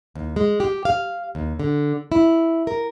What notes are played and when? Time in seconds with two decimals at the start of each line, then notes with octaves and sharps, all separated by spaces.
0.15 D#2
0.36 G#3
0.60 G4
0.85 F5
1.35 D#2
1.60 D3
2.12 E4
2.67 A#4